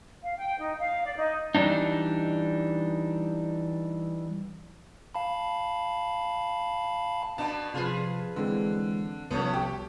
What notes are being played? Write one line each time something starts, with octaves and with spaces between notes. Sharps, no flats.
F5
G5
D#4
F5
D5
D#4
E3 G3 B3 D4 D#4
F5 A5 B5
B2 B3 D4 A5
C3 F3 F4 G#4 B4
D3 E3 G#3 C4
C2 F3 A3 B3 C#4 A5 C#6
G4